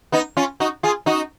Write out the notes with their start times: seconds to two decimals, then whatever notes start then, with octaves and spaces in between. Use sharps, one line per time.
0.12 B3 D#4
0.37 C#4 F4
0.60 D#4 F#4
0.83 F4 G#4
1.06 D#4 F#4